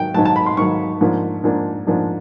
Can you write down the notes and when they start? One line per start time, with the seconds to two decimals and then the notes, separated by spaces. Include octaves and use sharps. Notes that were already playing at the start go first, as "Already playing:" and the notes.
Already playing: G#2 D#3 F#3 G5
0.14 G#2 D#3 F#3 A5
0.25 A5
0.36 B5
0.46 C6
0.57 G#2 D#3 F#3 C#6
1.01 G#2 F3 A#3 D4
1.44 G#2 F3 A#3 D4
1.87 G#2 F3 A#3 D4